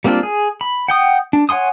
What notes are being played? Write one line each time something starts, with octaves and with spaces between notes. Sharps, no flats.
G3 A#3 C4 D4 F4
G#4
B5
F#5 G5 D#6
D4
C#5 F#5 G#5 C6 D#6